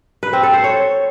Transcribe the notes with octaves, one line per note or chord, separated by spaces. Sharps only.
B4
C4
A4
C5
C#5